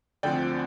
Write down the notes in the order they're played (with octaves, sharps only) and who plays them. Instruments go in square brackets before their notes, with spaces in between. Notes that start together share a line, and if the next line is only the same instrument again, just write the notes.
[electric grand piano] D2 D3 F3 C4 D5 G5